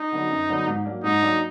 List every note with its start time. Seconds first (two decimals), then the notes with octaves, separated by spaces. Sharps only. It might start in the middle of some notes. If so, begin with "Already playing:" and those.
Already playing: D#4
0.12 D3 F#3 B3 D4
0.30 F#2
0.49 D3 F#3 B3 D4
0.66 G#2
0.85 F#3 A#3 D4
1.04 G#2 D#4
1.22 F#3 A#3 D4